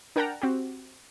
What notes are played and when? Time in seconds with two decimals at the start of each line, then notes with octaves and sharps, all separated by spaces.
0.16 D4 A#4 F#5 G5 A5 A#5
0.42 C4 F#4 G4